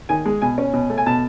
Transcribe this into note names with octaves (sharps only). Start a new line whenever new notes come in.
D#3 G#5
G#3
B2 G#5
C#4
B2
A3
G#5
B2 A5